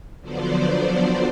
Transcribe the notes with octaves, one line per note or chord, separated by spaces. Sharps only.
D3 F3 F#3 B3 C5 D5